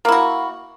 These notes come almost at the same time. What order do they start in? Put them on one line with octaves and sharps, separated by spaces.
A#3 E4 F#4